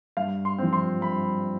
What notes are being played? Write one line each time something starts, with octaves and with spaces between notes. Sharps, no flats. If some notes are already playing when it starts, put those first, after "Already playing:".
G2 F5
C6
F3 C4
C6
G2 B5